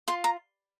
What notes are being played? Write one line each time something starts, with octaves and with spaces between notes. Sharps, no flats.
F4 C6
A#5